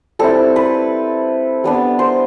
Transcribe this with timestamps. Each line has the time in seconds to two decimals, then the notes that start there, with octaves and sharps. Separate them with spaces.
0.19 G3 C4 E4 A4
0.56 B4
1.64 G3 B3 D4
1.99 C5